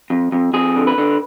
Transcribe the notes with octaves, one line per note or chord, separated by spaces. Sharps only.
F2
F2
F2 G#4
D3
B4
D3